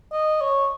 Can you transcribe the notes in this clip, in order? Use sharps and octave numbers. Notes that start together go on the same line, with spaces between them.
D#5
C#5